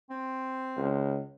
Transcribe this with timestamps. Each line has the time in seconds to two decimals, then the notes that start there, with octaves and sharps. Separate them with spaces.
0.10 C4
0.77 C#2